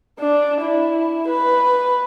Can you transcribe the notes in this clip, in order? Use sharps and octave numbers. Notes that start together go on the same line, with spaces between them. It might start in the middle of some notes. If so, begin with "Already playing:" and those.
D4
E4
B4